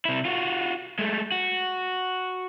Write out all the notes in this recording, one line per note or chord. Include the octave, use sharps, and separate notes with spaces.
C3 E4
F4 F#4
G#3 A3
F#4